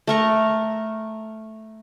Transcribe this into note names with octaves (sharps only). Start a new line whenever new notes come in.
A3 A#4 C#6